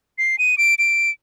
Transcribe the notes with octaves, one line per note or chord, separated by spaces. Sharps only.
C7
D#7
D7
D7